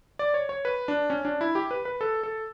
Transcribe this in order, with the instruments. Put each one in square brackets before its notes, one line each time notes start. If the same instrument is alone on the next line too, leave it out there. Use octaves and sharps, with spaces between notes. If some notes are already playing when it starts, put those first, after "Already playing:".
[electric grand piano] D5
C#5
C#5
B4
D4
C#4
D4
E4
G4
B4
B4
A4
A4